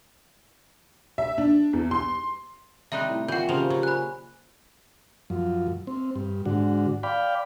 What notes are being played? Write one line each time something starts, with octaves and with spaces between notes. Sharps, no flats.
E5
D4
E2
C6
C3 G3 D#4 D5 E5 G5 F#6
A2
A#2 E3 F#4 F#5 G6
C#3 F3 F#3 C#4 G4 C5 F7
F#3
G#5 B5 F#6
F#2 F3
C4
G2
G#2 D3 F#4
D5 F5 G5 B5